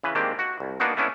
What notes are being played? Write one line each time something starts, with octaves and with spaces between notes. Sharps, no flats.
C#3 E3 B4
D#3 G#3 A#3 C4 D4 G4
F#4
C2
A#3 B3 D4 D#4 F#4
A3 B3 C#4 D4 E4